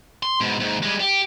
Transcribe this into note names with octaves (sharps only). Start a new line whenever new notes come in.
C6
G#2 B2
D#2 G#2
G3 G#3
G4